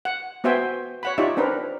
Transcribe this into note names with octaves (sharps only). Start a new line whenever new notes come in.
F#5
B3 F#4 C5 E5 G5 G#5
C#5 F#5 B5
D#4 F4 G4 C#5 D5 E5
C4 D4 A#4 B4